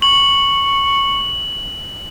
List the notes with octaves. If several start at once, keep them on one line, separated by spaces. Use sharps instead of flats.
C#6 F#7